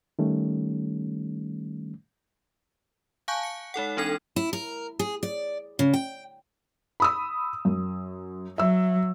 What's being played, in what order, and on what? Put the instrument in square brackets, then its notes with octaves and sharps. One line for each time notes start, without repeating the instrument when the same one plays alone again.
[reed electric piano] D#3 G3 A3 C#4
[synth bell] F5 G#5 A5 C#6 F#6 G6
C#7
G#3 D#4 A4 F#5
E3 C4 D4 A4 G#6
[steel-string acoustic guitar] E4
A#4
G#4
D5
C#3
G5
[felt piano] B5 D#6 E6
F#2
[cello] F#3 [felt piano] E5 E6